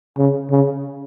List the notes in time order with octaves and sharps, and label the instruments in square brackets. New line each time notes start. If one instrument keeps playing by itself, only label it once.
[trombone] C#3
C#3